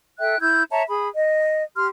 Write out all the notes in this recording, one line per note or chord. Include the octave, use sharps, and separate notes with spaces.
A4 E5 G5 F#6
E4 E6 G6 G#6
C#5 E5 A5 A#5
G#4 B5
D#5
G4 C6 F6